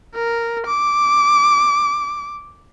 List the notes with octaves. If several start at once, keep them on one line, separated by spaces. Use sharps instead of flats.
A#4
D6